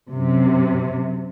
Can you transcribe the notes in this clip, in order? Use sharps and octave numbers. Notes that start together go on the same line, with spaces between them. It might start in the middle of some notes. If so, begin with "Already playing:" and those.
F#2 C3